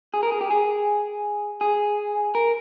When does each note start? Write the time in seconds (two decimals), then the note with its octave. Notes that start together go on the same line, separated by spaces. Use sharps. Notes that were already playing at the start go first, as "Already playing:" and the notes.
0.14 G#4
0.23 A#4
0.32 G#4
0.41 G4
0.51 G#4
1.61 G#4
2.35 A#4